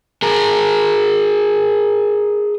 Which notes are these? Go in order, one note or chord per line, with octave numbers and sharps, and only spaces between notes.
G#4 A#4